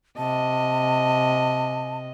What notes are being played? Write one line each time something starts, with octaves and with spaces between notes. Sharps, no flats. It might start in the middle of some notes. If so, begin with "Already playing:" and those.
C3 D#5 A5